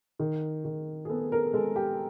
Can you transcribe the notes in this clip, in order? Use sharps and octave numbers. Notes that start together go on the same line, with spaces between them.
D#3
D#3
G#4
B3 A4
A#4
G#3 A4
G4